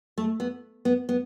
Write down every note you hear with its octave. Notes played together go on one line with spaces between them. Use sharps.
A3
B3
B3
B3